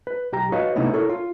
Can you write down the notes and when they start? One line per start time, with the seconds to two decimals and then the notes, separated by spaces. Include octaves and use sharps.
0.07 B4
0.32 B1 G4 A#5
0.52 F#4 B4 C#5 D#5 F5
0.76 C3 A3 B3 C#4 D#4 E4
0.93 E4 A4 A#4 C#5
1.09 F4